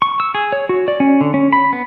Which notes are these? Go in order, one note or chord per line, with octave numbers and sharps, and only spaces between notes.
C#6
E6
G#4
C#5
F#4
D5
C#4
D3
C#4
B5
B3